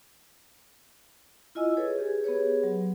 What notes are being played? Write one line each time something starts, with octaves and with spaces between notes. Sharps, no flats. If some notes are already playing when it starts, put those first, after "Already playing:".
E4 F4 D#5 G#5 E6
G#4 A4 B4 C#5
G4 G#4
B3 G4 G#4 B4 C#5
F#3